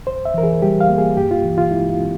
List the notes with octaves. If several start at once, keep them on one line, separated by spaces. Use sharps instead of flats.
F2 C5
E5
E3 A#4
G#4
G3 G4
F5
A#3
G#4
G2 G4
F4
E3
F4
G#3 E4
F4
C4